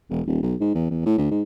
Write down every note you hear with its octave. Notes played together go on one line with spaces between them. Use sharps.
E1
D#1
B1
G#2
E2
E2
A2
D2
G#2